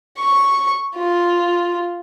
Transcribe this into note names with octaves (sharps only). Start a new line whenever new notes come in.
C#6
F4